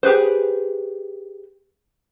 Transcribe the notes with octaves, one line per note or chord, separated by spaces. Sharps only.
G4 G#4 B4 C5